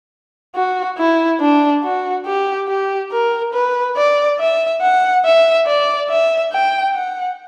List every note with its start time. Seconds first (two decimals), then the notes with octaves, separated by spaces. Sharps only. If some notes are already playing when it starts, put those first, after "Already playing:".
0.56 F#4
0.98 E4
1.40 D4
1.84 F#4
2.26 G4
2.68 G4
3.12 A#4
3.54 B4
3.97 D5
4.40 E5
4.82 F#5
5.25 E5
5.67 D5
6.10 E5
6.52 G5
6.95 F#5